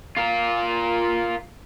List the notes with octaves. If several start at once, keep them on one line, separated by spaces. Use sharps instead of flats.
F4 A#4